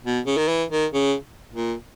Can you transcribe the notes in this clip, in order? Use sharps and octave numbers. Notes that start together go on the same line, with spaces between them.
B2
C#3
D#3
E3
D#3
C#3
A#2